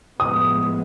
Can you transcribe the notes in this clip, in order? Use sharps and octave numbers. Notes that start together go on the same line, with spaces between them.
A1 A2 F3 G#3 B3 D#6